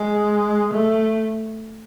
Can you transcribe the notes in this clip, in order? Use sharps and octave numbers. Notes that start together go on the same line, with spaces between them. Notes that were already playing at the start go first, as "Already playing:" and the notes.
Already playing: G#3
A3